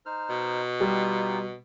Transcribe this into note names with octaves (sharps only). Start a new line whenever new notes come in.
D#4 C5 F6
B2
G3 D#4 F4 G4